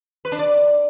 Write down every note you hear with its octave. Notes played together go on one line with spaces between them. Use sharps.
B4
D4
D5